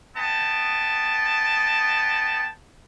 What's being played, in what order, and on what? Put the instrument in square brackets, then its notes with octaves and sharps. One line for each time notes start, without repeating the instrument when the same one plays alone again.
[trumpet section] B3 D#5 G5 A5